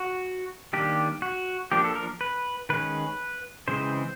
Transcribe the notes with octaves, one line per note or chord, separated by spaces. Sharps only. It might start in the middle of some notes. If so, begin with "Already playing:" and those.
Already playing: F#4
D#3 G3 A#3 D4 G4
F#4
F3 A#3 D4 G4
A4
A#4
B4
D#3 G#3 C#4 B4
C#3 E3 G#3 C4 C5